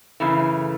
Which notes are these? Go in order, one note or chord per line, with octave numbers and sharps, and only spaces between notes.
F#2 C#3 E3 A3